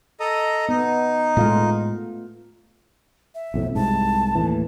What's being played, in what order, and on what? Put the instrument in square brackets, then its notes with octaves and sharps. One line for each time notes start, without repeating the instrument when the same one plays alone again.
[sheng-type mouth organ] A4 D#5 A#5
[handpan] B3 [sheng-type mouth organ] D#4
[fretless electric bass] A2 G#3 [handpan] A3 F4 F5
[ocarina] E5
[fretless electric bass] B1 F2 A2
[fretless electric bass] C2 G#2 [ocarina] A5
[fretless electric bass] D#2 A2 E3